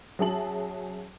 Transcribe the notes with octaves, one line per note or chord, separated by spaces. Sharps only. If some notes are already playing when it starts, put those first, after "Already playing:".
F#3 C#4 G#4 E5 A5 F#7